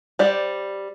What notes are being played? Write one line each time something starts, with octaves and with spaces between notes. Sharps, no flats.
G3 C5 D5